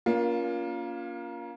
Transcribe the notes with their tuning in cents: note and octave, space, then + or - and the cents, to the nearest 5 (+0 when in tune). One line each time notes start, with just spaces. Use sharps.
A#3 +25 C#4 +40 F4 +0